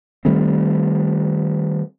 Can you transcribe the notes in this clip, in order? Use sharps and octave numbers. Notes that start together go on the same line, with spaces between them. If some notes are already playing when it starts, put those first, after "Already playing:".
D#3 G3 A3 C4